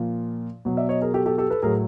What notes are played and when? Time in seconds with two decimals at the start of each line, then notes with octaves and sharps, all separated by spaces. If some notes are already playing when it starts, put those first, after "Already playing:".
Already playing: A#2 F3
0.65 B2 F#3
0.77 D5 E5
0.89 C#5 D#5
1.02 G#4 A#4
1.14 G4 A4
1.26 G4 A4
1.38 G4 A4
1.50 A4 B4
1.62 A2 F#3 G#4 A#4